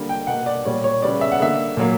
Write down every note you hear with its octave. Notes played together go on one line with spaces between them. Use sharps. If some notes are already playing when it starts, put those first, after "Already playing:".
Already playing: D3 G3 A#3
G5
B2 A#3 F#5
D5
A#2 G3 A#3 C#5
C#5
C#3 G3 B3 D5
E5
F#5
D3 A#3 E5
A#2 F#3 A#3